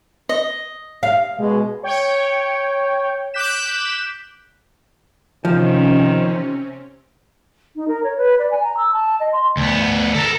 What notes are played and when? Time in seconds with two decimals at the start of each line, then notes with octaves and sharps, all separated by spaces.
0.29 D#5
1.03 F5
1.39 B2 G#3
1.83 C#5 G5
3.34 D6 F#6 G6 B6 E7
5.45 C3 D#3 F3 C4 C#4
7.75 D#4
7.87 A#4
8.03 C#5
8.17 B4
8.39 D5
8.51 G#5
8.63 A#5
8.77 E6
8.93 A5
9.19 D#5
9.32 C6
9.57 D2 B3
10.14 A4 A#4